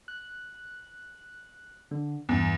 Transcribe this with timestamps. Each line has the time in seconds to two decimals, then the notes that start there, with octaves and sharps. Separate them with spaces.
0.08 F#6
1.91 D3
2.29 E2 G2